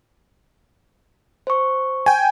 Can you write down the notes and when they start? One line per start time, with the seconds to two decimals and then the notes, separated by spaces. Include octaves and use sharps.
1.47 C5 C#6
2.06 G5 G#5